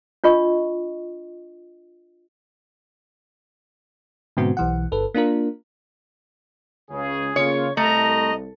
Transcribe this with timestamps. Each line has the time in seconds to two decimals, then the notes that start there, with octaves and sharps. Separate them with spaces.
0.24 D4 F4 D#5 C#6
4.37 G#2 B2 D3 B3 C4 F#4
4.57 B1 E3 F#5
4.92 G1 A4 B4
5.14 A#3 D4 F4 A#4
6.90 C#2 C#3 G#4
7.36 C#3 A#3 F4 C#5
7.77 C2 A3 D#5 A#5